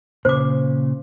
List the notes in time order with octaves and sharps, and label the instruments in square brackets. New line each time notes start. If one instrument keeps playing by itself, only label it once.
[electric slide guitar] A#2 C#3 [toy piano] C5 D6